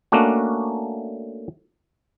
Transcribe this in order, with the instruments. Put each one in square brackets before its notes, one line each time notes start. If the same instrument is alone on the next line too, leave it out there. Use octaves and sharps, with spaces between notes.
[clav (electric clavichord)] A3 A#3 C#4 D4 F#4